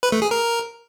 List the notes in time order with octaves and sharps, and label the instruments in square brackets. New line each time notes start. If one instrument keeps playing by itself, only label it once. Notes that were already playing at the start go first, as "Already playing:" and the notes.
[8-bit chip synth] B4
A3
G#4
A#4